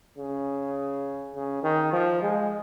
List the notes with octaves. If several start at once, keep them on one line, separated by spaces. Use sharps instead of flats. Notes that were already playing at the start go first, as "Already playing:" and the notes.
C#3
C#3
D#3
F3
G#3